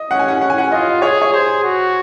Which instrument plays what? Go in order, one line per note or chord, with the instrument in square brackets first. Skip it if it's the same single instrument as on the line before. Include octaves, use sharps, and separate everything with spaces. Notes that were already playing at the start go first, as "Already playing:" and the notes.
Already playing: [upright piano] D#5
[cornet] C#4 [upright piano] F#5
[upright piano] G#5
F#5
[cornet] C#4 [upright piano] F#5
[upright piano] G#5
F#5
[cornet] F4 [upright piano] D#5
[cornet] G#4 [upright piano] C#5
[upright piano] C#5
[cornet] G#4 [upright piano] C5
[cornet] F#4